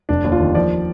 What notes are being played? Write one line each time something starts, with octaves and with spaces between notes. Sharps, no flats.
F1 D4
D#2
F4
D#3
F3 D5